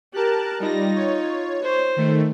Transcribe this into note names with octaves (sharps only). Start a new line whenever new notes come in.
G4 A#4 A5 F#6
G3 D#4 F4 A#6
C#5
C5
D#3 A3